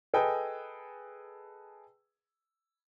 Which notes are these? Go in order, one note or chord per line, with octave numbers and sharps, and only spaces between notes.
G#4 A4 B4 D#5 G5 G#5